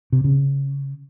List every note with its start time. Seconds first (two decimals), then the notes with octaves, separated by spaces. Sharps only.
0.12 C3
0.24 C#3